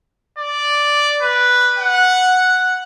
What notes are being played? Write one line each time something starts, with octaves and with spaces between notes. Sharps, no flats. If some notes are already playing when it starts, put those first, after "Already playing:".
D5
B4
F#5